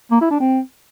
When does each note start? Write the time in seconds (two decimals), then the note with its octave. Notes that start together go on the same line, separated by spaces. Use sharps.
0.11 A#3
0.21 E4
0.31 D4
0.40 C4